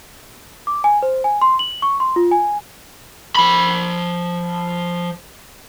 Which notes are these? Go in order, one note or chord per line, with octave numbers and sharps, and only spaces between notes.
D6
G#5
C5
G#5
C6
F#7
C#6
C6
F4
G#5
F3 B5